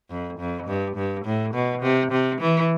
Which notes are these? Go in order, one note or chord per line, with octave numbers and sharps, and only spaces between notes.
F2
F2
G2
G2
A2
B2
C3
C3
E3